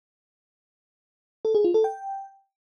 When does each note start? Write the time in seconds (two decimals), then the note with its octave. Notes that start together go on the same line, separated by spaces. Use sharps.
1.45 A4
1.55 G#4
1.64 F4
1.74 A4
1.84 G5